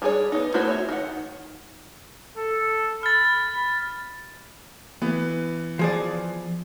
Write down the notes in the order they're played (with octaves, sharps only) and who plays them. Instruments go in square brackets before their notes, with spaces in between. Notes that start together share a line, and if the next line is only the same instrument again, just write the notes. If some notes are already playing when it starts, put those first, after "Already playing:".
[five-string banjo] G3 D4 G#4 A4 C#5
B3 D#4
A3 E4 F#4 A#4 C5
C#5 E5
D#3 F#5
[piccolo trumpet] A4
[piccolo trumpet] B5 [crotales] F6 A6
[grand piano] E3 B3
[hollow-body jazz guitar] F3 G#4 D5